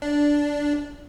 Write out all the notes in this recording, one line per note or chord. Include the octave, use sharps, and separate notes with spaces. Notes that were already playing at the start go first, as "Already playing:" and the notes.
D4